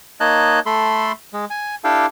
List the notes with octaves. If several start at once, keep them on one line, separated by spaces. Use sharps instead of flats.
A#3 D#4 C#5 D#5 A5 F#6
A3 A4 B5 C6
G#3
G#5
D4 E4 G4 A4 F5 G5